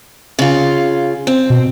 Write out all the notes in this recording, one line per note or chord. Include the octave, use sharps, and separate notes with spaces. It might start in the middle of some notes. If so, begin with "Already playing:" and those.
C#3 F4
C4
B2